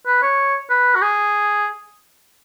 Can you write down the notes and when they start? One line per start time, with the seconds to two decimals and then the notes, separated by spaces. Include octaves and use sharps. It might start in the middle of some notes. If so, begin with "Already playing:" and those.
0.07 B4
0.22 C#5
0.70 B4
0.95 F#4
1.02 G#4